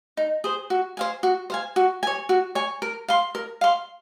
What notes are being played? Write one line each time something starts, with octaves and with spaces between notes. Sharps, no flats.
D#4
G#4 C5
F#4
C5 F5 G#5
F#4
C5 F5 G#5
F#4
C#5 G#5
F#4
C#5 G#5
A#4
F5 C6
A#4
F5 C6